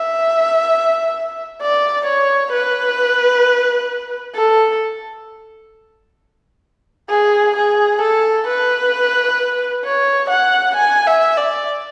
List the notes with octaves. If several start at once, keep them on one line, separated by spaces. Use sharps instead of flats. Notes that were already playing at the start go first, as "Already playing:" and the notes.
Already playing: E5
D5
C#5
B4
A4
G#4
G#4
A4
B4
C#5
F#5
G#5
E5
D5